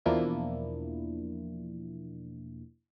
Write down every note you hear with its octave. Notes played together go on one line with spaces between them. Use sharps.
E2 B2 F3 A#3 D4 E4